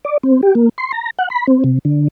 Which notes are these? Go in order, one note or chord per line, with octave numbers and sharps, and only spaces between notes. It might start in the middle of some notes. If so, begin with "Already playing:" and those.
D5
C4
G4
A#3
C6
A#5
F#5
B5
C4
C3
D3